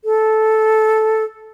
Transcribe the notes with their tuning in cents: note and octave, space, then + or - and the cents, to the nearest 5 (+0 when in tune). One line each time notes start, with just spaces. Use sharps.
A4 -10